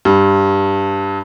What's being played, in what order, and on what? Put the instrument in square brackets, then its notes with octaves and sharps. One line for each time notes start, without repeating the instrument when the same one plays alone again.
[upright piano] G2